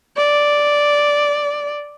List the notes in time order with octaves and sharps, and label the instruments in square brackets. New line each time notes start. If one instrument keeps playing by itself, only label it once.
[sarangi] D5